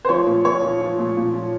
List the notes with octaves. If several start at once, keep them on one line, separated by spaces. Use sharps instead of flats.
C5
F3 C#5
A#2
A#2 C#5
F3
F3
A#2
A#2
F3